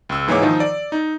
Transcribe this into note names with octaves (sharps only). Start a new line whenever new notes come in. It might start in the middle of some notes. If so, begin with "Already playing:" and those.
C#2 E6
G#2 E3 G#3 A#3 C#5 D6
D#3 F3 D#4 F4
D5
D#4